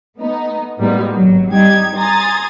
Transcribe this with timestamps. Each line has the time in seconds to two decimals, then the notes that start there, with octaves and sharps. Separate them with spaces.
0.18 A3 B3 D#4
0.79 A2 G3 G#3 A#3 B3 D#4
1.14 G#1 F#3
1.50 G3 D#4 G4 G#6
1.96 G#5 A#5 C6 D#6 G#6 A6